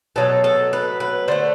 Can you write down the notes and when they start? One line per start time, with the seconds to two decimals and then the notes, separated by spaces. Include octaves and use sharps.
0.16 B2 F#3 A3 A4
0.44 A4
0.73 B4
1.00 B4
1.28 D3 A3 C5